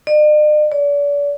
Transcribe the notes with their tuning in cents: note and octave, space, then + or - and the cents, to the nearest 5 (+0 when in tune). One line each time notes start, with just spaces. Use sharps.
D5 +45
D5 -40